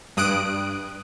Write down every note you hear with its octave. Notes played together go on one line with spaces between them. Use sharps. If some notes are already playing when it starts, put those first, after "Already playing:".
G2 D#6 F#6 D7